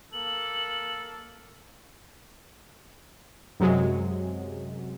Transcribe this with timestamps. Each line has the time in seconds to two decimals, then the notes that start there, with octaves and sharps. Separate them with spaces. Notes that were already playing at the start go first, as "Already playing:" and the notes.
0.13 A#3 A4 F#7
3.60 F#2 C3 F#3 G#3